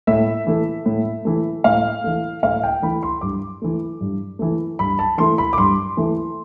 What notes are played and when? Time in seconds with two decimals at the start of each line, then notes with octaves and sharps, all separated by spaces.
0.07 A2 E5
0.47 E3 A3
0.86 A2
1.25 E3 A3
1.64 A2 F5
2.04 E3 A3
2.43 A2 F5
2.63 G5
2.82 E3 A3 B5
3.03 C6
3.21 G2 D6
3.62 E3 A3
4.01 G2
4.39 E3 A3
4.79 G2 B5
4.99 A5
5.18 E3 A3 C6
5.38 B5
5.53 D6
5.58 G2 C6
5.97 E3 A3